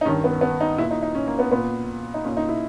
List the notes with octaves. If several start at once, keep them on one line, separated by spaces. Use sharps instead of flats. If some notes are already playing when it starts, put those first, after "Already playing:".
D#4
G2 D#3 C#4
B3
B3
D#4
A#2 E4
D#4
D#4
C#4
A#3
B3
A#2 B3
D#4
A#2 C#4
D#4
E4